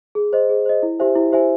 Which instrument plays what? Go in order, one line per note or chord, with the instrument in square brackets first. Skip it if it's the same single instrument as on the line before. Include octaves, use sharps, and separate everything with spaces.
[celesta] G#4
C5 D#5
G#4
C5 D#5
E4
G4 C5 E5 G#5
E4
G4 C5 E5 G#5